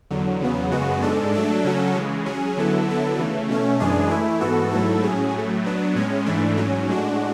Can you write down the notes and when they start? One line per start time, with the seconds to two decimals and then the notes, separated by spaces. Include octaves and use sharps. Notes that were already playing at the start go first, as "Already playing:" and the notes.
0.11 E2 D3 F#3
0.40 E2 C#3 F#3 B3
0.71 F#2 C#3 G#3 B3 F#4
1.02 G#2 G#3 D4 A4
1.34 F#3 A3 D4 A4
1.65 C#3 F#3 C#4 F#4 A4
1.95 C#3 E3 G#3
2.26 F#3 C#4 G#4
2.57 D3 F#3 B3 E4 A4
2.87 D3 F#3 B3 E4 A4
3.19 C#3 E3 A3
3.49 B2 A3 C#4
3.80 F#2 E3 G#3 D4 G#4
4.10 E3 A3 E4
4.41 G#2 E3 B3 F#4 A4
4.72 G#2 F#3 A3 E4 A4
5.03 A2 F#3 C#4 G#4
5.34 A2 F#3 A3
5.64 F#3 B3 D4
5.95 A2 G#3 C#4
6.26 G#2 E3 A3 D4
6.57 G#2 F#3 C#4
6.88 A2 G#3 D4 F#4